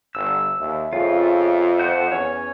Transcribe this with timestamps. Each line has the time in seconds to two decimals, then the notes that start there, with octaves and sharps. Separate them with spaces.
0.15 G1 E6
0.60 D#2 E5
0.93 F2 C#3 F4
1.79 C5 F#5
2.11 E2 C#4 C#5